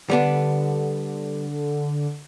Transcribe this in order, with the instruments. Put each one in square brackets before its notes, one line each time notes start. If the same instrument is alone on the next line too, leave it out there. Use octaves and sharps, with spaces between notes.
[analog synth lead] D3 [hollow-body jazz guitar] G3 B3 D4